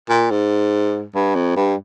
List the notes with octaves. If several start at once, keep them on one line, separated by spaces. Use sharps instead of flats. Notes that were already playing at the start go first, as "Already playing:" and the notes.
A#2
G#2
G2
F2
G2